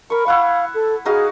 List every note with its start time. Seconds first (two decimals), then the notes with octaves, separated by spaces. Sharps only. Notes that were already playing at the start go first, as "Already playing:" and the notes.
0.10 A#4 B5 C#6
0.26 E4 F5 F#5 C#6
0.74 A4
1.05 D#4 F#4 G#4 F5